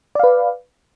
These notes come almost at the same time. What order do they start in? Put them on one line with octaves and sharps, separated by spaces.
D5 F5 B4